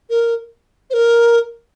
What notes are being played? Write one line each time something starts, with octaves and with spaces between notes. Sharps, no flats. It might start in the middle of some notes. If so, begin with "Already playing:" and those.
A#4
C5
A#4